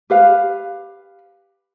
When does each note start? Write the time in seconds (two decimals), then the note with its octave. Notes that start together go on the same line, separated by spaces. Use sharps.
0.10 G4 B4 F5